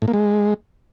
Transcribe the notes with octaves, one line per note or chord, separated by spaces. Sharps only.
A2
A#3
G#3